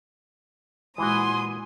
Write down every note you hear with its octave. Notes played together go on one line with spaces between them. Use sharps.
A#2 E3 G#3 E4 F#4 G#5 C6 D#6